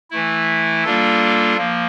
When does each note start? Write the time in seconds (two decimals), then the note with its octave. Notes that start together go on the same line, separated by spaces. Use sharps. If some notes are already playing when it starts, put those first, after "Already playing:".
0.10 E3 A3 E4
0.84 G3 A#3 D4 F4 A4
1.58 F3 A#3